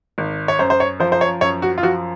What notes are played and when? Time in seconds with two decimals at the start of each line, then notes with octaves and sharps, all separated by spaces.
0.18 G#1
0.48 C#5
0.59 F#2 C5
0.70 C5
0.80 C#5
1.00 F3 C5
1.12 C5
1.21 C#5
1.41 F#2 C#5
1.62 F#4
1.78 F4
1.83 F3 F#4